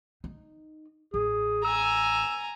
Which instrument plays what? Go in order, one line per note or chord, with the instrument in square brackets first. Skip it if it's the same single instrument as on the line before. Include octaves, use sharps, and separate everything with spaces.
[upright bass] D#4
[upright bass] A1 [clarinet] G#4
[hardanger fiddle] G#5 A#5 [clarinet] E6